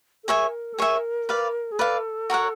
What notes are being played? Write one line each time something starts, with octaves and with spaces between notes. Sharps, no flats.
A4
G#4 A#4 C#5 E5 G#5
A4
G#4 A#4 C#5 E5 G#5
B4 D5 F5
G#4
A4 B4 D5 F5
F#4 A#4 C#5 F#5